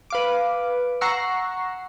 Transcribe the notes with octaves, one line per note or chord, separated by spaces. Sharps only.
B4 F5 D6
F#5 A#5 C#6 E6 C7